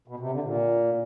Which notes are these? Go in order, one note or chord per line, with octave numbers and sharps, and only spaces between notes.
B2
C3
D3
A#2